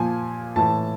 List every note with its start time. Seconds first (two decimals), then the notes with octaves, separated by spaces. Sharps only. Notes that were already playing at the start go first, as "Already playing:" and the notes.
Already playing: A#2 F3 G#5
0.56 A2 E3 A5